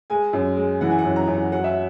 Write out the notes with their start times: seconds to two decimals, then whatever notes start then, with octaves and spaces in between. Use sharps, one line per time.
0.10 G#3 G#5
0.33 F#2
0.57 G#3
0.81 E3 F#5
0.91 G#5
0.99 F#5
1.05 F#2
1.16 A#5
1.28 F#2
1.34 F#5
1.52 F#3 F#5
1.64 E5